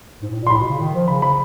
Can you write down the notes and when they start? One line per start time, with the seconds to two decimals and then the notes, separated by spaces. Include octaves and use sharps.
0.22 G#2
0.31 A2
0.41 A#2
0.47 C6
0.50 A2 B5
0.60 B2
0.69 C#3
0.80 D#3
0.94 F3
1.08 C#3 B5
1.22 B5